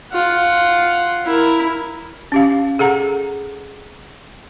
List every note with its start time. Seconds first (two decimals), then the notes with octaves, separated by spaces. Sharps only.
0.13 F4 F#5
1.25 E4 A#4
2.32 C#4 G4 F5
2.79 G#4 A4 F#5 A#5